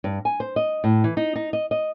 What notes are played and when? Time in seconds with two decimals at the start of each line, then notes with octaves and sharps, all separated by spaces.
0.04 G2
0.25 G#5
0.40 C5
0.56 D#5
0.84 A2
1.04 E3
1.17 D#4
1.36 D#4
1.53 D#5
1.71 D#5